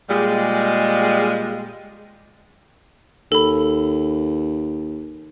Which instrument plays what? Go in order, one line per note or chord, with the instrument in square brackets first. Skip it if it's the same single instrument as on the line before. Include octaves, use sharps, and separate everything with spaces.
[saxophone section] A#2 G3 G#3
[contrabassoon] D#2 [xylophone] A4 B5